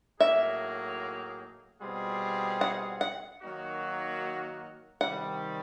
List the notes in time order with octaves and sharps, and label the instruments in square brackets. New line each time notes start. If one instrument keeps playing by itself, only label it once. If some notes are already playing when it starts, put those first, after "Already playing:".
[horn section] A2 F#3 A#3 D#4 G#4 [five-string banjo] E5
[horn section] B2 G3 C4 F4 G#4
[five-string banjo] F#5
F#5
[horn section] D#3 F#3 A#3 D#4 F#4
[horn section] C3 D#3 G3 [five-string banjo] F#5